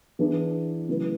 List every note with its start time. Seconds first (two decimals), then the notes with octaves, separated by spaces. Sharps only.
0.19 E3 B3 D4 G#4
0.89 C#3 F#3 A3 E4 B4